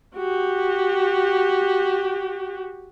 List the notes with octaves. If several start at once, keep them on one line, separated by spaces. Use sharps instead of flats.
F#4 G4